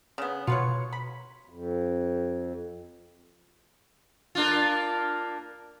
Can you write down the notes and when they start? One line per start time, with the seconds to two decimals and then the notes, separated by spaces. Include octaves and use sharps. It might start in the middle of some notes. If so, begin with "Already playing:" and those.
0.18 C#3 B3
0.47 B2 F4 B4 C#5 C#7
0.93 B5
1.50 F2
4.35 A#3 D4 F4